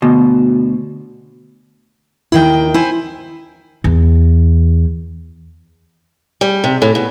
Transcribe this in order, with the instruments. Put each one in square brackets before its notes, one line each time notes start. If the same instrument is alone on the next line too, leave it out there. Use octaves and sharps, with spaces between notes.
[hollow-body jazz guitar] D2 B2
[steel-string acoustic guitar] D#2 D#3 G5 [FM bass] E4
[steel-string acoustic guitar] E4 C5 G#5
[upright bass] E2
[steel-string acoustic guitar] G3
C3
A2
B2